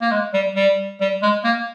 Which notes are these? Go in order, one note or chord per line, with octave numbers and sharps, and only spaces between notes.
A#3
G#3
G3
G3
G3
G#3
A#3